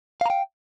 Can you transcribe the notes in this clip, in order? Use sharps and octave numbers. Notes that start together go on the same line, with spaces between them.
F5 G5 A#5